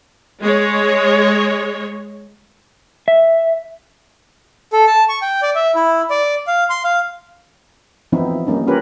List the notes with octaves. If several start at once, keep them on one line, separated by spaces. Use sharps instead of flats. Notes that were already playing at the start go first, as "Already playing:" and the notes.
G#3 C#5
E5
A4
A5
C#6
G5
D5
E5
E4
D5
F5
C6
F5
E3 F3 B3 C4 D#4 E4
G3 A#3 C#4 D#4
C#4 F4 G4 A#4 B4 C#5